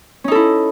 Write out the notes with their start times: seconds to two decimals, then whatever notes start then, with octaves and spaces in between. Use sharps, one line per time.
0.24 C#4
0.28 D#4
0.32 A4
0.35 E4